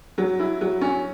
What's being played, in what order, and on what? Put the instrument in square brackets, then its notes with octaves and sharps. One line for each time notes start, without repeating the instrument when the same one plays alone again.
[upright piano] F#3
E4
F#3
C#4